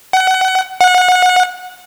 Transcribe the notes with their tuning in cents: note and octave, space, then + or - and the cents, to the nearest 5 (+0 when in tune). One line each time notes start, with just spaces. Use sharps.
F#5 +25
F#5 -25